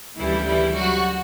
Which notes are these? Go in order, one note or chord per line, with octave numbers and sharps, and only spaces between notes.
D2 C#3 E3 G3 E4
E3 E4
F#3 F#4